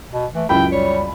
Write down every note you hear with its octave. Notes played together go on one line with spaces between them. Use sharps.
B2
E3 A3
C#2 F#2 E4 G5 B5
G3 C#5